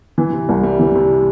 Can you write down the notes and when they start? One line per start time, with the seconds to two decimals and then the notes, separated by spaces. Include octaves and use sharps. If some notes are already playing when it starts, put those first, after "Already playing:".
0.18 E3
0.32 C3
0.49 C2
0.63 G3
0.79 E3
0.95 C3